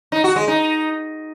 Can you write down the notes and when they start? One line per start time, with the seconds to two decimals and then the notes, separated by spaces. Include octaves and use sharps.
0.12 D#4
0.24 F#4
0.36 G#3
0.48 D#4